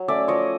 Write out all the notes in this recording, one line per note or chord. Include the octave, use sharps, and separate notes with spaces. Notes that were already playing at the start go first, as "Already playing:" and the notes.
Already playing: F#3
A3 C#4 D5 E5
F3 C#5 D#5